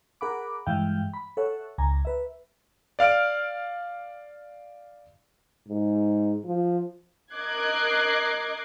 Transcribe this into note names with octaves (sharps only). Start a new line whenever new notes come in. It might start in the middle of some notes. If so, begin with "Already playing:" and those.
G#4 A#4 F#5 B5 D6
G2 E3 G#3 E5 F5 G5
B5
A4 C#5 E5 F#5
C#2 G#5 A#5
B4 E5
D5 F5 F6 D7
G#2
F3
A#4 D#5 D6 F#6 G#6 C7